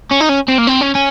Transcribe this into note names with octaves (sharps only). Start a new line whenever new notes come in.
C#4
D#4
C#4
C4
A#3
C4
C#4
C#4